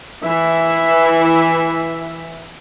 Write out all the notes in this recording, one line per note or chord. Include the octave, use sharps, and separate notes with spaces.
E3 E5